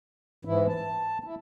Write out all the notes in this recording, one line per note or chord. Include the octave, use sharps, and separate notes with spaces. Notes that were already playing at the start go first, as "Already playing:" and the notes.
G#2 E3 E4
A5
E4